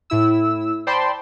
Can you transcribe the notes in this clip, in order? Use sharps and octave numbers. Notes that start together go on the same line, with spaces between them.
A2 E4 E6
C5 D5 G5 A5 B5 C6